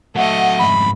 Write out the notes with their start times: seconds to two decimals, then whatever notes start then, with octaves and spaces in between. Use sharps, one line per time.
0.16 F#3 A3 A4 D#5 F#5
0.59 F2 G#2 B5